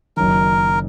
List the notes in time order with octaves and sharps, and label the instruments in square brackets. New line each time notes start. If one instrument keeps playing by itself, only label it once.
[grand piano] F#1 F#2 D#3 [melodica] A#4